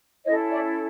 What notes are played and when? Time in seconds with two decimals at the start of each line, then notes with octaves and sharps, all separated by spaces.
0.24 C#4 E4 A4 C#5 D#5
0.50 D5 E5